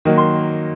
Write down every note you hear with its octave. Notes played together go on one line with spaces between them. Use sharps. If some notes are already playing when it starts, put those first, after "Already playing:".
D#3 F#3 A#3
C6